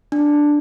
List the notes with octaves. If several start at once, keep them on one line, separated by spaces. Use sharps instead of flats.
D4